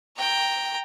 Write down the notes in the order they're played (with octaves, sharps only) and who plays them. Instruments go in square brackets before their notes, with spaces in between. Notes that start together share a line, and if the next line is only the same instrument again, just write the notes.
[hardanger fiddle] G5 A#5